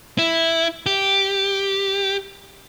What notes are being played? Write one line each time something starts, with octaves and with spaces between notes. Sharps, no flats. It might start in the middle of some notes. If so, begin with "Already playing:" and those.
E4
G4